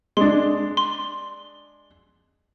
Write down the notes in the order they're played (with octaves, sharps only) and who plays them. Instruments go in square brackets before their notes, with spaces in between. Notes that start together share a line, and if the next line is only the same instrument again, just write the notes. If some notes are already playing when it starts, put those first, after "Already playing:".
[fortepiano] G#3 D4 [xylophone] C6
[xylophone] C6